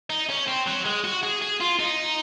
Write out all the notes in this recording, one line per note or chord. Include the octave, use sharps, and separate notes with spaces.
D#4
C#4
C4
F#3
G#3
F#4
G#4
G#4
F4
D#4